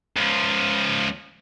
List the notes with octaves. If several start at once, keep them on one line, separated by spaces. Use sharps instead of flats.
C#2 F3